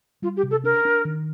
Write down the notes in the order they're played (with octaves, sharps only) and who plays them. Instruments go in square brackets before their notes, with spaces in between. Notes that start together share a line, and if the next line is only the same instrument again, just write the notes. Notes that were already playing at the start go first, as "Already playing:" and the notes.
[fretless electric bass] G3 [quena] F4
[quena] G4
[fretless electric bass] C3
[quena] A4
[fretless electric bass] D4 [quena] A#4
[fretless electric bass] D4
D#3